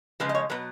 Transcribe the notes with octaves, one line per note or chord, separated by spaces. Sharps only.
C#3 F3 G#3 B4
D#5
C#5
B2 F#3 B4